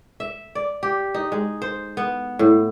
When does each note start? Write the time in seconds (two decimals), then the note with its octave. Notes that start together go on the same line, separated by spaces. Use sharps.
0.20 E5
0.55 D5
0.83 G4
1.14 D#4
1.32 G#3
1.62 C5
1.97 B3
2.39 A2